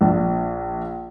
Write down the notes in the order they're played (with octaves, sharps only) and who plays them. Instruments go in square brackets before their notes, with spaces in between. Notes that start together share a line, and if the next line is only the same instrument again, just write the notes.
[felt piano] A#1 D4